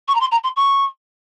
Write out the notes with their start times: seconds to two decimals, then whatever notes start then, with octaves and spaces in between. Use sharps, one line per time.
0.08 C#6
0.15 A#5
0.20 C6
0.32 A#5
0.44 C6
0.56 C#6